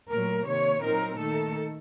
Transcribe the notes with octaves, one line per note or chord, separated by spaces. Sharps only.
A#2 F#3 A3 A#4
C3 D#3 A#3 C#5
A#2 F#3 C4 D#4 A#4
D#3 A3 D#4 A4